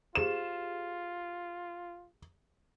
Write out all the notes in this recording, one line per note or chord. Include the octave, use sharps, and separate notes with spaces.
F4 G4 G#4 C5 E7